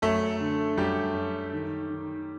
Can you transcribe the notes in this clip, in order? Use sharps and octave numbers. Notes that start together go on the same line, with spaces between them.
F#2 A3 A4
D3
F#2 G3 G4
F#2
D#3
D#3